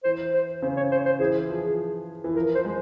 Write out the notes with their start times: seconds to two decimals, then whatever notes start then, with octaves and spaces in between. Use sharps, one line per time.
0.04 E3 C5
0.33 C5
0.62 C#3 C5
0.77 C#5
0.92 C5
1.06 C5
1.19 E3 G#4
1.49 F3 G#4
2.24 E3
2.35 F3 A#4
2.55 C5
2.65 G#3